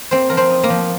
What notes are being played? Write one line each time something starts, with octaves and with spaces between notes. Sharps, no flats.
A#3 C4 C5
F3 A#4
C4 C5
D#4
A#3 A#4
F3